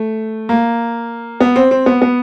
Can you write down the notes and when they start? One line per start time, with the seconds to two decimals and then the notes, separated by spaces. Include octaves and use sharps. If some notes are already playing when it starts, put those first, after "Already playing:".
Already playing: A3
0.49 A#3
1.40 B3
1.56 C4
1.71 C4
1.86 B3
2.02 B3